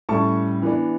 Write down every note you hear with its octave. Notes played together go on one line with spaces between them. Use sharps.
A2 G3 C#4 A5 C#6
E3 B3 D4